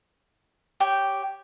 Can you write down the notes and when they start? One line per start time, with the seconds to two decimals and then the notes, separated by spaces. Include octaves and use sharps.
0.80 G4 C#5 G5